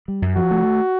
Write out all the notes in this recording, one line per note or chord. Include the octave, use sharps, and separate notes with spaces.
G3
F#2
F3 F#4
A3